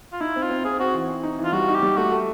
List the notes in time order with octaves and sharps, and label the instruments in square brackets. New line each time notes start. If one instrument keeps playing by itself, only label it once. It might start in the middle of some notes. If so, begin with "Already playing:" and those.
[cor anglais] F4
[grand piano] D#4 [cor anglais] E4
[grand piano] C4
[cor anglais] F4
[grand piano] C4
[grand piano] C4 [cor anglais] G#4
[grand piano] C4 [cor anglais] F#4
[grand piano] E3
C4
D#4
E3
[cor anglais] F4
[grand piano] G3 [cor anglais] F#4
[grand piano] D#4
[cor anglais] G4
[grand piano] G3
[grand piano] A3 [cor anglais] F#4
[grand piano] A3